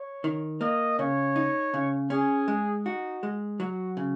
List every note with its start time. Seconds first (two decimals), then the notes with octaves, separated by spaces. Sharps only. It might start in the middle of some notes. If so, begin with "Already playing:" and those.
Already playing: C#5
0.24 D#3
0.61 A#3 D#5
0.98 C#3 C#5
1.36 D#4
1.74 C#3
2.10 C#4 G#4
2.48 G#3
2.85 D#4 F#4
3.23 G#3
3.60 F#3 F#4
3.97 C#3